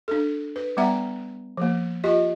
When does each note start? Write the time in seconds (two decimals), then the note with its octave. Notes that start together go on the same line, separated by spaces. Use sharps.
0.08 D4 A4
0.56 B4
0.77 G3 B3 E5 F#5 A#5
1.57 F3 A#3
2.04 F4 G4 D#5